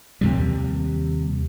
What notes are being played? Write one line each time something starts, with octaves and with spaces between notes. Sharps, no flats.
D#2 C3 G3